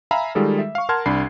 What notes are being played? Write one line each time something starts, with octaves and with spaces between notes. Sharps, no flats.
E5 F5 G#5 A#5 B5
D#3 G3 G#3 F4 G#4 A4
E5
F5 C#6
A#4 F#5 A5 C6 F6 G#6
C2 D4 B5 C7